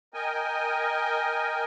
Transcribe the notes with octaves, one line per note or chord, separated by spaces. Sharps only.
A#4 D#5 G5 G#5